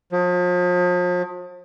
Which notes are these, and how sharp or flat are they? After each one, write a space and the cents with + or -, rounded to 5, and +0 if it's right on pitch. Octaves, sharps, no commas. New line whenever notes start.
F3 +40